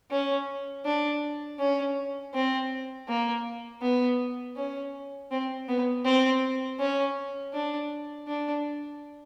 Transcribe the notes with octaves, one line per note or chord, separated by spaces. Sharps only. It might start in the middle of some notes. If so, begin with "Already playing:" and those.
C#4
D4
C#4
C4
A#3
B3
C#4
C4
B3
C4
C#4
D4
D4